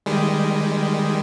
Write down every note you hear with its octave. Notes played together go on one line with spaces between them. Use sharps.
D#3 G3 G#3